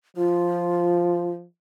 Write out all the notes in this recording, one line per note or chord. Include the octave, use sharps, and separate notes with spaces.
F3 F4